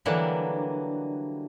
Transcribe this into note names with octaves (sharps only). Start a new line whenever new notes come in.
D3 E3 F#3 G3 A#3 D4